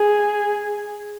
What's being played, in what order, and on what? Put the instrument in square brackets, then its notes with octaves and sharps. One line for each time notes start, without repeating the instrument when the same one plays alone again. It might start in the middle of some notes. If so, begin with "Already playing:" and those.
Already playing: [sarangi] G#4